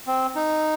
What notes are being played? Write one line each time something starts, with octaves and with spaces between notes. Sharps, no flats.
C4
D#4